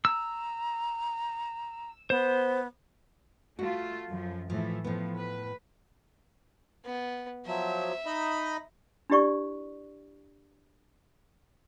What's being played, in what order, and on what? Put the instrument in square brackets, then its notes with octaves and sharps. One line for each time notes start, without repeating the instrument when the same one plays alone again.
[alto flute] A#5 [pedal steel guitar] E6
[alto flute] B3 [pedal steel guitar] C5
[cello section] A3 F4 [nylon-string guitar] F#4
[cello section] F#2 F3
[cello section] A2 E3 A3 [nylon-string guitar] F3
[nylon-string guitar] A2 B3 [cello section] F3
[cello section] B4
[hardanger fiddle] B3
[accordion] F3 F#3 [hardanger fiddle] E5
[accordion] D#4 D#5 B5
[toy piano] D4 E4 G4 D5 C#6